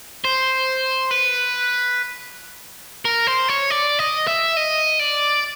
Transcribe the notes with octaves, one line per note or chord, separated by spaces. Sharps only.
C5
B4
A#4
C5
C#5
D5
D#5
E5
D#5
D5